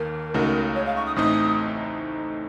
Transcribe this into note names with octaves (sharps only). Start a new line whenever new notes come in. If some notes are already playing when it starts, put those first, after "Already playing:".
Already playing: D#2 D#3 A#3 A#4
C#2 C#3 A3 D#4 F#4
C#5
F5
C#6
D#6
A1 A2 A3 C4 D#4 D#6